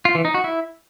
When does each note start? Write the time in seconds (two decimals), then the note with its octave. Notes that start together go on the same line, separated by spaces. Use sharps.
0.05 F4
0.15 E3
0.25 D#4
0.34 F#4
0.44 E4